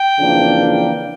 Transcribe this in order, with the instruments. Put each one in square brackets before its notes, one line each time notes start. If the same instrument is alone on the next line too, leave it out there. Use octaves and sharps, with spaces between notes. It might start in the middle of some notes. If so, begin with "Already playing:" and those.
Already playing: [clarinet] G5
[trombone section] F2 C#3 E3 A#3 D4